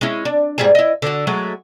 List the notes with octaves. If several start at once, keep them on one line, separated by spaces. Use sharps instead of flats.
G#3 C#4 E4
D4
G#2 G3 G#4
E4 D#5
D3 F#4
F#3 G#3 A3